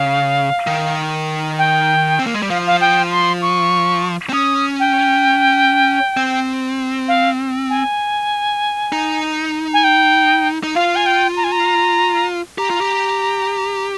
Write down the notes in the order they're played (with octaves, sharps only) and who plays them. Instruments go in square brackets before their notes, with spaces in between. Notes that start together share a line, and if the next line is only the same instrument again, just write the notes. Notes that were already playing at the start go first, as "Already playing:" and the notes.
Already playing: [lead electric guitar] C#3 [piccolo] F5
[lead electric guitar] D#3
[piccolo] G5
[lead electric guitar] C4
A#3
G#3
G3
[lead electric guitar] F3 [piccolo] F5
[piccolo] F5
G5
C6
C#6
[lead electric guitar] C4
[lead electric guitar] C#4 [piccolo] D#6
[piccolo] G5
[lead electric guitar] C4
[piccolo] F5
G#5
[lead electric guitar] D#4
[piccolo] G#5
G5
[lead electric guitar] D#4
[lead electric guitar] F4 [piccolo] F5
[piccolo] G#5
G5
A#5
G#5
A#5
[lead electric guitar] G4 [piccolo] A#5
[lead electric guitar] F4
G4